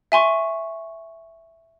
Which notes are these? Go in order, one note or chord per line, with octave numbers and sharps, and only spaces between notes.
E5 G#5 C6 C#6